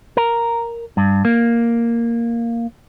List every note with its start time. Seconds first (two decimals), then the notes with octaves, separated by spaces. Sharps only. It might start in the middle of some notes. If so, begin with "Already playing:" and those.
0.17 A#4
0.97 G2
1.25 A#3